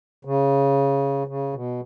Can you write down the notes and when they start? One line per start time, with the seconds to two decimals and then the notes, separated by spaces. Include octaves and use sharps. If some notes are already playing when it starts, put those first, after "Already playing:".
0.25 C#3
1.27 C#3
1.54 B2